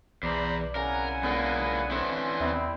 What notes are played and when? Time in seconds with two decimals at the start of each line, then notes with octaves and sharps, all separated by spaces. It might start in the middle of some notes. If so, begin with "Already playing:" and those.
0.23 B1 E2 C5 D5 A#5 B5
0.75 C#3 E4 A#4 F#5 G#5 A#5
1.23 C#2 D3 A#3 B3
1.91 D3 E3 C4 C#4
2.40 D#2 C3 B3 C4 E4